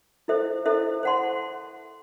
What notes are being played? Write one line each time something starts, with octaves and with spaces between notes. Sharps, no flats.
E4 A4 C5 E5
E4 A4 C5 E5
C5 F#5 A5 C6